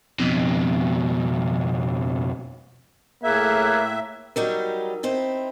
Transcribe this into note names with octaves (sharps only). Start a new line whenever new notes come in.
F2 B2
A2 A#3 G#4 E5 F#6 G#6
F#3 G3 D#4 A#4
C4 D#4 E4